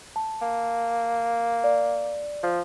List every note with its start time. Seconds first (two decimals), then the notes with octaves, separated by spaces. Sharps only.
0.16 A5
0.41 A#3
1.64 D5
2.43 F3